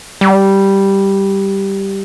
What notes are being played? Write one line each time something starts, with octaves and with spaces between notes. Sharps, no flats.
G3